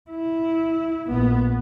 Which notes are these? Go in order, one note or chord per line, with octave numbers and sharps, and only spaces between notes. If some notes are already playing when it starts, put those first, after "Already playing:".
E4
A#1 B3